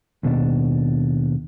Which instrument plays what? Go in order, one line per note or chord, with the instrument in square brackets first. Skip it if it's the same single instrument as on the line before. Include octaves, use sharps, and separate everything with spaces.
[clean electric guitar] D#2 B2 D4